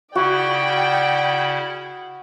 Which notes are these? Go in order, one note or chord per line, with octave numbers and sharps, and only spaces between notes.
C#3 E4 F#4 D5 G5